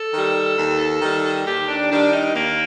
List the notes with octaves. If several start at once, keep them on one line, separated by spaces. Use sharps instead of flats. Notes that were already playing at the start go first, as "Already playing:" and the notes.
Already playing: A4
D#3 G3
D#2
D#3 G3
D#2 G4
D4
D#3 G3 D4
D#4
D#2 A#3